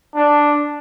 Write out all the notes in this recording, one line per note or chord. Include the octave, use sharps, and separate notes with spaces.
D4